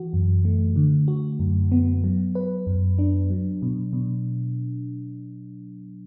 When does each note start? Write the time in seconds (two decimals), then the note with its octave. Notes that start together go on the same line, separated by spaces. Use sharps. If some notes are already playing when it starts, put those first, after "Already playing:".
Already playing: E3 F#4
0.13 F#2
0.45 A3
0.76 D3
1.08 F#4
1.40 F#2
1.72 B3
2.04 F#3
2.35 B4
2.67 F#2
2.99 D4
3.30 F#3
3.62 B2
3.93 B2